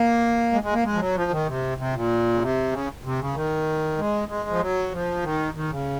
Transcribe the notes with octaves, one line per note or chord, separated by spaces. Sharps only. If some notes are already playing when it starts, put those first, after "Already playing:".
Already playing: A#3
G#3
G#3
A#3
G#3
F3
F#3
F3
D#3
C3
C3
A#2
C#3
C3
C#3
C3
C#3
D#3
G#3
G#3
F3
F#3
F3
D#3
D#3
C#3